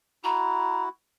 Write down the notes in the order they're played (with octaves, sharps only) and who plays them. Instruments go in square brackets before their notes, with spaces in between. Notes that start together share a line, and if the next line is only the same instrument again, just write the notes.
[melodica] E4 F#4 [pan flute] A#5